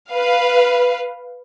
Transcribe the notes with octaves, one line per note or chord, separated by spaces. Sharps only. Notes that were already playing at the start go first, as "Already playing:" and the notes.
B4 F5